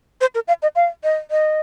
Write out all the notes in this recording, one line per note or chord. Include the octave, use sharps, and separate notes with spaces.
C5
A#4
F5
D#5
F5
D#5
D#5